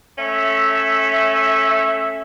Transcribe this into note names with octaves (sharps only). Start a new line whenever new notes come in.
A3 C#4 E5